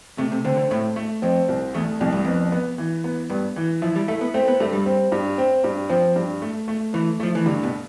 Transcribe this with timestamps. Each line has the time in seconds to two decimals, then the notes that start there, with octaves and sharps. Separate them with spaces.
0.18 C3 A3
0.32 C3
0.45 D3 C4
0.57 D3
0.70 A2 A3
0.96 A3
1.22 F2 C4
1.48 C2
1.74 E2 A3
2.00 C2 F2
2.12 G2
2.24 F2 B3
2.52 B3
2.78 E3
3.04 B3
3.30 G2 B3
3.56 E3
3.82 F3 E4
3.96 G3
4.08 A3 E4
4.21 B3
4.34 A3 C4
4.48 B3
4.60 G2 A3
4.73 G3
4.86 C4
5.12 G2
5.38 C4
5.64 G2
5.90 F3 C4
6.16 G2
6.42 A3
6.68 A3
6.94 E3 A3
7.20 F3 A3
7.35 E3
7.46 G2 D3
7.63 B2